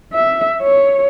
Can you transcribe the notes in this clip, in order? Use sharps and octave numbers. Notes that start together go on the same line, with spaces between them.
E5
C#5